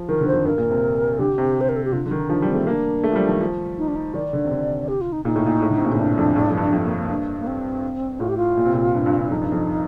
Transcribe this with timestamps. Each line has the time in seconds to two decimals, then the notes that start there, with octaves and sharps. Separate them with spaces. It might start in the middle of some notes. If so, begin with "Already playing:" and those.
Already playing: F3
0.09 D#3 A#4
0.21 D3
0.27 C5
0.33 F2
0.45 G2 A#4
0.58 A#2
0.70 C3
1.19 D3 G4
1.38 C3
1.61 C5
1.69 A#4
1.76 A4
1.84 G4
1.92 D3 F4
2.06 D3
2.11 D#3 D#4
2.29 F3 D4
2.42 G3
2.48 C4
2.54 A3
2.67 A#3 D4
3.04 A3
3.12 F3
3.16 G3
3.28 D#3
3.41 F3
3.78 D#4
3.88 D4
3.95 D#4
4.14 D#3 D5
4.33 D3
4.45 C3
4.51 D3
4.88 G4
5.01 F4
5.12 D#4
5.25 A#2 D#4
5.35 A2
5.46 A#2
5.62 A2
5.70 D3
5.77 C3
5.84 A#2
5.92 A2
5.99 G2 D4
6.17 F2
6.36 A2
6.43 G2
6.50 F2
6.57 G2
6.68 G2
6.73 F2
6.85 A#3
6.98 A#3
7.10 G2
7.39 A#3
7.47 C4
8.20 A2 F4
8.29 G4
8.37 F4
8.57 A#2
8.65 C3
8.73 A#2
8.94 G2
9.06 G2
9.19 G2
9.30 F2 D#4
9.42 G2
9.52 F2